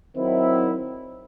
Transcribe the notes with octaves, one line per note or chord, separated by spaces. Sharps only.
D#3 F#3 C4 E4